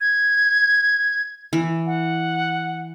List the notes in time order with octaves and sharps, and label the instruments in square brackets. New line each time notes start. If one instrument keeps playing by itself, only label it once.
[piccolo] G#6
[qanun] E3
[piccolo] F#5